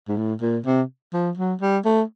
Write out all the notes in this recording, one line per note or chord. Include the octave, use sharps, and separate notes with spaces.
G#2
A2
A#2
C3
F3
F#3
G3
A3